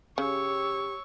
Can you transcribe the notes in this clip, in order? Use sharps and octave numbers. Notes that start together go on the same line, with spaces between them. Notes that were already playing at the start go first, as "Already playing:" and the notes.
C#3 G4 C#5 C#6 E6